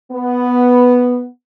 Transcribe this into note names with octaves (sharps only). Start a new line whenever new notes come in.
B3